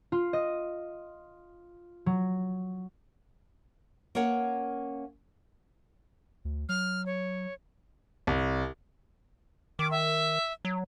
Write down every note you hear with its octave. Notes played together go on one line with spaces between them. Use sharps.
F4
D#5
F#3
A#3 C#4 A#4 C#5 F#5
D2
F#3 F6
C#5
C2
D#3 D6
E5
F#3